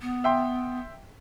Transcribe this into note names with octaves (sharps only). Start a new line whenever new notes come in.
B3
E5 G5 C6